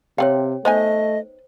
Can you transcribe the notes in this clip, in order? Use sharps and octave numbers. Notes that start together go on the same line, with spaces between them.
C3 C4 C#5 F5 G5
A3 B3 D#4 C5 D#5 G#5